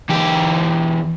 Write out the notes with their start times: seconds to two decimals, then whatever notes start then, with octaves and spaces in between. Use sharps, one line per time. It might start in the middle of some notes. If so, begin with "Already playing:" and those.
0.09 E2 G4